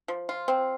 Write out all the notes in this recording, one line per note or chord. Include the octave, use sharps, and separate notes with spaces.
F3
F4
C4